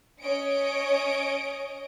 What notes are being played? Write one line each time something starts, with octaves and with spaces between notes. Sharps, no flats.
C#4 C#5 D#5 D7